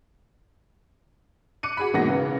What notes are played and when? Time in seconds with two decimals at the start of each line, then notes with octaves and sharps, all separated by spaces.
1.63 D6 F#6 C#7 D#7
1.77 F#4 G#4 B5
1.93 E2 G#2 B2 A#3 F#5 A#6
2.08 C#3 E3